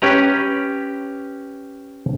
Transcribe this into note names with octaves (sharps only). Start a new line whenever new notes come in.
C#4 G4 B4 A#5